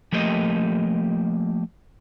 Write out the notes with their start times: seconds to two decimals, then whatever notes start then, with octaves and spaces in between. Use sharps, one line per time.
0.12 F3 A3 A#3 G4 D#5